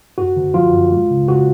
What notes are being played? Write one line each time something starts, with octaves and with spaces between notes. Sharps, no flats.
F#2 F#4
D3
F3 F4
F#2
G#3
C#3
C#3 F#4